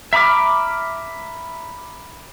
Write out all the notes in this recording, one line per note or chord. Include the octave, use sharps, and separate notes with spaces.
E5 A#5 B5 D6 F6